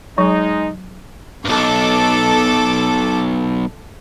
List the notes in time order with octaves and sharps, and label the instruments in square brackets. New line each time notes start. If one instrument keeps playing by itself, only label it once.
[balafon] F#3 [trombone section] G#3 D#4
[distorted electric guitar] B1 G2 [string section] A4 D6